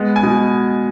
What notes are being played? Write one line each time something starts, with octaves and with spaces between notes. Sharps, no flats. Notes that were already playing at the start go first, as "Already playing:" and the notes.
Already playing: G#3 B3
G#5
B2